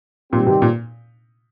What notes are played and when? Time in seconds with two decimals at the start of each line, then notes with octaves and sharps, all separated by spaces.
0.32 A#2 D#3 G3 C4 G4
0.47 C3
0.62 A#2